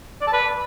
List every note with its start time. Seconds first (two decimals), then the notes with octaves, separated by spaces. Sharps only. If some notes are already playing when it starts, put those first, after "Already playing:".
0.21 D5
0.27 A5
0.33 B4